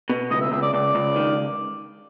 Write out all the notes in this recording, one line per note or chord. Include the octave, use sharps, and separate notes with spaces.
B2
C#2 D#5
E5
C#2 E5
D5
C#2 D5
C#2
D#3